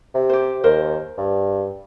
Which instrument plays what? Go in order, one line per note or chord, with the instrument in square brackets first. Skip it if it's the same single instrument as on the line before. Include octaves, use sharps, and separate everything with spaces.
[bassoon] C3
[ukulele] G4 C5
[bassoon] D#2 [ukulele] A#4 C5
[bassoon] G2